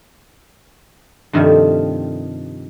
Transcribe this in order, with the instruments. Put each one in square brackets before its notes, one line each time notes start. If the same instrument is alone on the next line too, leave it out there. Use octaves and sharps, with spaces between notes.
[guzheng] G2 C3 D#3 F3 G3 A3